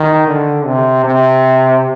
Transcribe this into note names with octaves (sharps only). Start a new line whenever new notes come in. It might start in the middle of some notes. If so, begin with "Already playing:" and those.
Already playing: D#3
D3
C3
C3